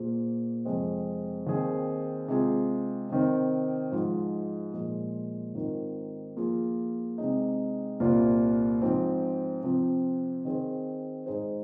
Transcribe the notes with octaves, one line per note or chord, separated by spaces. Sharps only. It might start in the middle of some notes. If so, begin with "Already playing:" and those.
Already playing: A#2 A#3 G#4 C5
F2 C3 G#3 C4
D#2 D#3 C4 G#4
C3 G#3 F4 G#4
C3 D#3 C4
G#2 F3 G#3 F4
A#2 F3 G#3
G#2 D#3 C4 F4 A#4
F3 A#3 F4 G#4
C3 G#3 D#4
C2 A#2 A#3 F4 C5
G#2 F3 C4
C3 F3 C4
D#3 C4 G#4 C5
G#2 G#3 D#4 G#4 C5